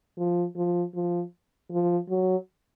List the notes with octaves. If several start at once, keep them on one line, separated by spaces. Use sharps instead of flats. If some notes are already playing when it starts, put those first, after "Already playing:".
F3
F3
F3
F3
F#3